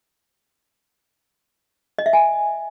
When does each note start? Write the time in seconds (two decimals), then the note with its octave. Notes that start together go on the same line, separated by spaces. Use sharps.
1.99 D#5
2.06 E5
2.13 G#5